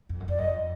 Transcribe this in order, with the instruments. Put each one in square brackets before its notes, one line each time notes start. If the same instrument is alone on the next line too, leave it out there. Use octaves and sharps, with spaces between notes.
[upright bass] F2
F#2
[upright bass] F2 [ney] D5
[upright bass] F#2 [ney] D#5
[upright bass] F2